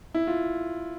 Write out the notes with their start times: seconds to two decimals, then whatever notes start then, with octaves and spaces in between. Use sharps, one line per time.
0.14 E4
0.27 F4